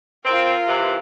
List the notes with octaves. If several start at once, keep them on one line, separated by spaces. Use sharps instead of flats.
C4 F4 A#4
C3 E3